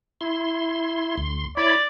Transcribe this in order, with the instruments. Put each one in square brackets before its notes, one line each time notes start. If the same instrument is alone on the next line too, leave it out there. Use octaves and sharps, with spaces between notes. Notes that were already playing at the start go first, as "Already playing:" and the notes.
[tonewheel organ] E4 C6
D2 C6
[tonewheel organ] E4 C#5 B5 [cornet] D5